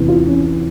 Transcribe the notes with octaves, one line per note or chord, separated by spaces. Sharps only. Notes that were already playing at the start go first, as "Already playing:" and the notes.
Already playing: E2 C3 E3
F4
C#4